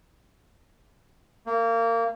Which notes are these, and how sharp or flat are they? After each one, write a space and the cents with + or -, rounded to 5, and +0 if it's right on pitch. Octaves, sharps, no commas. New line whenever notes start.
A#3 -25